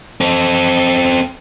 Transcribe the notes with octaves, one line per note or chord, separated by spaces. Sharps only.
C4 A4